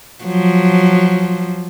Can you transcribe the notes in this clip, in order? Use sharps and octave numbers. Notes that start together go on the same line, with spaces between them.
F3 F#3